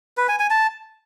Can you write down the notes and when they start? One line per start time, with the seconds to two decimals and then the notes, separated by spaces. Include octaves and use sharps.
0.17 B4
0.28 G#5
0.39 G#5
0.50 A5